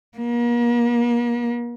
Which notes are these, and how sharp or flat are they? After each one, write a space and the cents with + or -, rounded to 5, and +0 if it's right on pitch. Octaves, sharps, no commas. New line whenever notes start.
A#3 +40